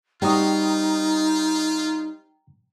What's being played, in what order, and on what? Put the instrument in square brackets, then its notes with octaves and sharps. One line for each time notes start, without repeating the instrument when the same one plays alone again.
[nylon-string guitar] G3 C4 F#4 [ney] D#4 [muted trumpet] F4 [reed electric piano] G5 A#5 D#6